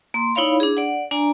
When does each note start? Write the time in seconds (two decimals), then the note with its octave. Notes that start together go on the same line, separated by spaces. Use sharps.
0.14 A#3 C6
0.35 D#4 E4 C#5 D5 F5 B5
0.60 D4 G#4
0.77 D5 F#5
1.11 D4 D5 G#5 A#5